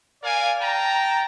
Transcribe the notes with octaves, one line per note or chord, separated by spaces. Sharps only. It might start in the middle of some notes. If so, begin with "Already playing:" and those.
A#4 D5 F5 G#5
G5 A5 A#5